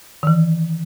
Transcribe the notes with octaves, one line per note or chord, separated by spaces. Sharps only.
D#3 E3